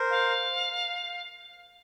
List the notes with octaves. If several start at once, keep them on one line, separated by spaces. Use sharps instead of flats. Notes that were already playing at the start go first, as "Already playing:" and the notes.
Already playing: A#4 C5
F5